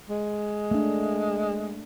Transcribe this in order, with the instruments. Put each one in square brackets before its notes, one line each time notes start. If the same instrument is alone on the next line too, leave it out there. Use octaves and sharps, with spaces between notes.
[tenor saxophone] G#3
[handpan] A3 D4